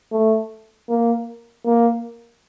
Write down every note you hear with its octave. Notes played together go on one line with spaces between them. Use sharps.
A3
A#3
A#3